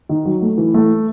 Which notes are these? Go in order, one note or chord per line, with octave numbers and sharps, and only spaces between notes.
D#3
F#3
A3
E3
A3